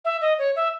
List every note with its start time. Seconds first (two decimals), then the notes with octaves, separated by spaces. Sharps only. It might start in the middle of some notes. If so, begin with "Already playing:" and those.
0.05 E5
0.21 D#5
0.39 C#5
0.56 E5